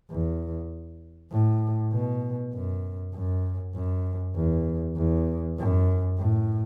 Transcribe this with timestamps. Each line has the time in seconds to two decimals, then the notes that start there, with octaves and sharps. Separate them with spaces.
0.10 E2
1.31 A2
1.92 B2
2.54 F#2
3.14 F#2
3.75 F#2
4.36 E2
4.97 E2
5.58 F#2
6.18 A2